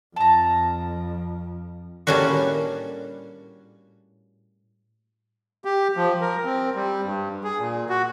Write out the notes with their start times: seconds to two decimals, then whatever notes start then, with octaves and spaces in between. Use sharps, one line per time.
0.16 F2 A5 A#5
2.07 A2 G3 A#3 C#4 D4 F#4
5.65 G4
5.96 F3
6.21 A#4
6.45 C4
6.75 G3
7.04 G2
7.44 G#4
7.59 A#2
7.90 F#4